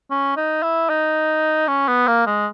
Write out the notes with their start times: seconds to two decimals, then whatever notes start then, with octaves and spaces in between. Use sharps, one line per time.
0.11 C#4
0.37 D#4
0.63 E4
0.89 D#4
1.68 C#4
1.88 B3
2.07 A#3
2.26 G#3